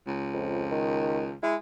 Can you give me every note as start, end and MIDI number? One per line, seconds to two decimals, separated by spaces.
0.07 1.34 37
0.34 0.66 41
0.71 1.29 51
1.43 1.56 56
1.43 1.56 64